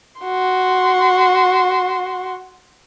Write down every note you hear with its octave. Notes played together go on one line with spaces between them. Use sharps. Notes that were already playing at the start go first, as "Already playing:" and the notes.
F#4 C6